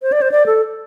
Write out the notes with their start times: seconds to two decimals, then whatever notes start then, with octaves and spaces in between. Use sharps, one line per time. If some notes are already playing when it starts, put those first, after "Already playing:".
0.02 C5
0.12 D5
0.22 C5
0.32 D5
0.46 A4